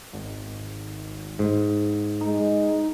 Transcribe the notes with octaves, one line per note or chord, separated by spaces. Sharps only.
G#1
G#2
G#3 D#4